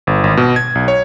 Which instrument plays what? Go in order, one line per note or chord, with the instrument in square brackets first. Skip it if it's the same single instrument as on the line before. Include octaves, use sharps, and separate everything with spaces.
[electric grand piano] G1
G#1
B2
G#6
B1
C#5